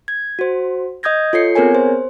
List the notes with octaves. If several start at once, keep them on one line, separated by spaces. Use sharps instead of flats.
G#6
F#4 C5
D#5 D#6 G6 G#6 A#6
F4 A4 C#5 C7 C#7
B3 C4 G#4 A#4 C#5 G#5
C5